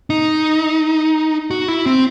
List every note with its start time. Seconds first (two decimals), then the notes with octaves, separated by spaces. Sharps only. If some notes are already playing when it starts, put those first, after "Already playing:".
0.10 D#4
1.51 F#4
1.68 E4
1.86 C4